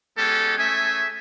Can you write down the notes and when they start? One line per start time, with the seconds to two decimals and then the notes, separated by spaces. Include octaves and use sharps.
0.18 G#3 B3 C#4 G4 A4
0.58 A3 C#4 G#4 E5 G#5